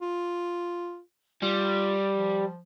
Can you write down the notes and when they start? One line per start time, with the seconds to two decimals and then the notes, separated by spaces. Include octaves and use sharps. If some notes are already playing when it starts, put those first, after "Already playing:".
0.01 F4
1.42 G3 F4
2.15 F3